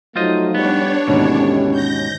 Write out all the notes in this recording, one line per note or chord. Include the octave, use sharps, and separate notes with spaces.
F3 F#3 A3 D#4 F4 C5 D#5
G3 B3 D4 C#5
D#2 G#2 B2 D3 E3 C#4 G4
G6 A#6